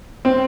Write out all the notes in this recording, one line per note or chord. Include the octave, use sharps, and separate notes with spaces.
C4